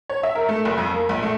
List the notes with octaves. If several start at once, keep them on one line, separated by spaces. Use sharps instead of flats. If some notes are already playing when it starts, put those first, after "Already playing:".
C#5
E5
A#4
A3
F#1
F2
A#3
A#1
A3